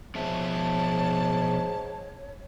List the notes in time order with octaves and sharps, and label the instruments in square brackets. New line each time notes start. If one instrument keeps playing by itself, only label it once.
[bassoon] G#2 [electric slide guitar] B2 F3 E5 [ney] C#5 [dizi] A5